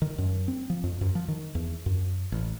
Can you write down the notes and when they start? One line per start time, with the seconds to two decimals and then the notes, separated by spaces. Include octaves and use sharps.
0.02 D#3
0.18 F#2
0.48 C4
0.70 F3
0.84 F2
1.01 F#2
1.15 F3
1.28 D#3
1.55 E2
1.86 F#2
2.32 A1